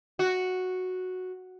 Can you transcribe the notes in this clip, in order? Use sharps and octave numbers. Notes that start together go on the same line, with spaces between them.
F#4